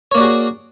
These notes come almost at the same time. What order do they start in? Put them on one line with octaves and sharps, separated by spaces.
C#5 A#3 D5 F#4 G#4